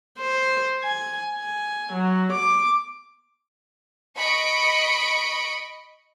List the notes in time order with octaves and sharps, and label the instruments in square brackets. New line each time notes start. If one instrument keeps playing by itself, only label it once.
[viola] C5
G#5
G#5
F#3
D6
[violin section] D#5 B5 C#6 C#7 D7